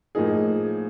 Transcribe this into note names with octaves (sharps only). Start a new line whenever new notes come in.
A2 F3 A#3 D#4 G#4